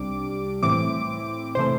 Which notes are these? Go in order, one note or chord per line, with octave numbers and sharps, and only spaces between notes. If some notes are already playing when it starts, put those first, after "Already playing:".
Already playing: C2 C3 G3 D4 D6
A2 E3 C4 E4 D6
C3 E3 A3 C5